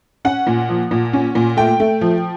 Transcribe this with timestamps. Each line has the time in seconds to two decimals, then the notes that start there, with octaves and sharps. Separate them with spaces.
0.25 C#4 F#5
0.47 A#2
0.69 F3
0.91 A#2
1.13 C#4
1.35 A#2
1.57 A3 G5
1.80 A3
2.01 F3